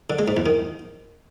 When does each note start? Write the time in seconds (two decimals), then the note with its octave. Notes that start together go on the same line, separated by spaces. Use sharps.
0.10 D3
0.19 G#3
0.28 G#2
0.37 E2
0.46 D#3